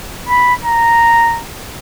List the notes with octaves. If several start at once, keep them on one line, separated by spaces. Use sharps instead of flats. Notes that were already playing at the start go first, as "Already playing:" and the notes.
B5
A#5